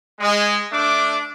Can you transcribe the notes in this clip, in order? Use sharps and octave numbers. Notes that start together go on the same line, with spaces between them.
G#3
A3 D4 D6